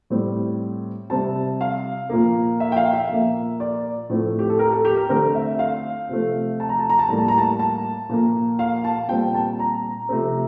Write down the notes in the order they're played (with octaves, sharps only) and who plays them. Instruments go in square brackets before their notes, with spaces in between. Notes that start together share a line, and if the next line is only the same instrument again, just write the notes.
[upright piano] A2 G3 C4
C3 G3 C4 A5
F5
A#2 F3 A#3
E5
G5
F5
E5
A#2 F3 A#3
D5
A2 F3 A3 C4
G4
A4
A#4
A4
G4
A#4
D3 A3 C4 A#4
E5
F5
C3 F3 A3 C4
A5
A#5
A5
A#5
A5
A2 G3 A#3 A#5
A5
A#5
A5
A5
A#2 F3 A#3
F5
A5
A#2 G3 C4 G5
A5
A#5
C3 F3 A3 C4